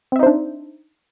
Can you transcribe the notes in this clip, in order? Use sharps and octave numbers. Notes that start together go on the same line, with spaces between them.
C4 D4 D#4 C5 E5